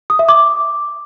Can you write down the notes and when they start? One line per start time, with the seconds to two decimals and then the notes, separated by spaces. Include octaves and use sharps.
0.10 D#6
0.19 E5
0.29 D6